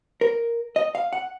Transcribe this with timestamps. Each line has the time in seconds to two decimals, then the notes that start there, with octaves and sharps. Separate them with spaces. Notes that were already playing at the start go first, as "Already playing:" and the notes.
0.21 A#4
0.76 D#5
0.95 F5
1.13 F#5